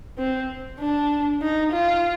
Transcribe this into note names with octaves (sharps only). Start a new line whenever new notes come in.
C4
D4
D#4
F4